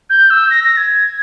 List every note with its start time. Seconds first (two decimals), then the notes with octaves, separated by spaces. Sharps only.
0.10 G6
0.30 E6
0.50 A#6
0.64 A#6
0.77 G#6